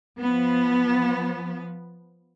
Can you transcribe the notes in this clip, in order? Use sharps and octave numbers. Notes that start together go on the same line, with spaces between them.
F3 B3